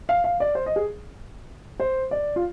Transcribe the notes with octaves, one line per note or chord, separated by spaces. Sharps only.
F5
F5
D5
C5
D#5
G#4
C5
D5
F4